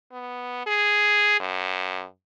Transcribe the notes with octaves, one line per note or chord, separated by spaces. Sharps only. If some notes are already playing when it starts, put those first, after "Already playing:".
B3
G#4
F#2